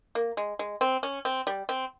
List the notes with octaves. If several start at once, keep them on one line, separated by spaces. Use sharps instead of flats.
A#3
G#3
G#3
C4
C#4
C4
G3
C4